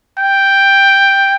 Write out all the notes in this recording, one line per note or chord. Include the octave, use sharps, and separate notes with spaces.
G5